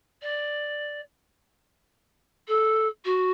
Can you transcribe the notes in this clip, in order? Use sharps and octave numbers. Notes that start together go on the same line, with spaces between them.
D5
A4
F#4